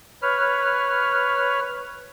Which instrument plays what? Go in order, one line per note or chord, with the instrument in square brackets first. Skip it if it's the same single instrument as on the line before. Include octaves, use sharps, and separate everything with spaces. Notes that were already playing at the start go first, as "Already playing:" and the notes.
[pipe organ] B4 C#5 F6